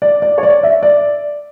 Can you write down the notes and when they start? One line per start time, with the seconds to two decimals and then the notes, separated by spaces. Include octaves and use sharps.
0.02 D5
0.22 D5
0.38 C#5
0.43 D5
0.63 E5
0.83 D5